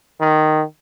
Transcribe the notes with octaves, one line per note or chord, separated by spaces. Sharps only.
D#3